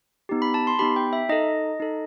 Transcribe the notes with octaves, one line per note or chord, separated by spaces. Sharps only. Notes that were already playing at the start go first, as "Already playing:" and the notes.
B3 D#4 G4
B5
A5
C6
B3 D#4 G4 B5
G5
E5
D#4 A4 D#5
D#4 A4